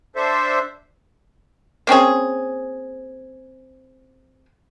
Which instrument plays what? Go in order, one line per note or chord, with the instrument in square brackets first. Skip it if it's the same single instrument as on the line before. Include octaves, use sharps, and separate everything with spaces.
[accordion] D4 A4 C5 E5
[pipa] A#3 C4 C#4 G#4